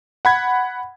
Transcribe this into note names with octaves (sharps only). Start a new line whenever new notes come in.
F#5 B5 G#6